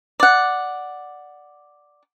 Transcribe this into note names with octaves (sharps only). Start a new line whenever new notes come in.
D5 F#5